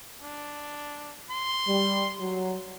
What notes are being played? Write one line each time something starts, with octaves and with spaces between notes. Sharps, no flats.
D4
C6
G3
F#3